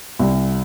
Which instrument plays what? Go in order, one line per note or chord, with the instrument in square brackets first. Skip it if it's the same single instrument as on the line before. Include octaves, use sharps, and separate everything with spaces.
[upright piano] C2